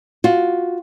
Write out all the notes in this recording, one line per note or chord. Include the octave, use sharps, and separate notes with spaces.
F4 F#4